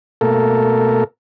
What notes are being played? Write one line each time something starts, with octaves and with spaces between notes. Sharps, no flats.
B2 A3 A#3 A4 A#4